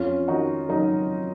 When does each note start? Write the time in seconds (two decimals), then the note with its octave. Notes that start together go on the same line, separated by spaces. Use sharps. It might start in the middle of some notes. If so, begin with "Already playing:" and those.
Already playing: F2 C#4 F4
0.28 D#3 D#4 F#4
0.69 F#3 D#4